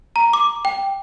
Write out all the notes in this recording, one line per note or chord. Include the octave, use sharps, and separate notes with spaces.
A#5
D6
G5